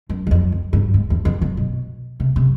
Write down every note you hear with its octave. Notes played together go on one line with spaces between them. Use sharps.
F#2
E2
F2
F2
G2
G#2
E2
F2
F#2
B2
C3
C3